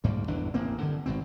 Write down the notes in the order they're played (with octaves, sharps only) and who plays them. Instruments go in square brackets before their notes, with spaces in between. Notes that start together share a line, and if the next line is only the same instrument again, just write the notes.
[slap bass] D2 G#2 G3 A#3
G1 E2 E3 D4
A1 A#3 C4
G2 D3
G#1 G#2 B2 C4